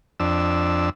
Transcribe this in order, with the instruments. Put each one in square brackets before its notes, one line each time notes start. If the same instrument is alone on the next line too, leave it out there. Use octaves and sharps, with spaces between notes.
[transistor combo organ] F2 D4 E6